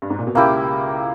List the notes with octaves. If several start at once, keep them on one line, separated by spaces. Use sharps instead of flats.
G2
G#2
A#2
B2
C#2 C#3 A#3 E4 G4